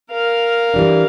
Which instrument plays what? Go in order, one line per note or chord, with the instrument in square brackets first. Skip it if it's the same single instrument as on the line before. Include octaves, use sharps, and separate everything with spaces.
[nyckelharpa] A#4 F5
[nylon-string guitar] E3 G3 D4